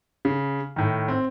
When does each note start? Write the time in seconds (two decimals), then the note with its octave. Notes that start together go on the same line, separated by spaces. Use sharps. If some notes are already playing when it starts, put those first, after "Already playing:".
0.25 C#3
0.76 A2 D#3
1.08 C4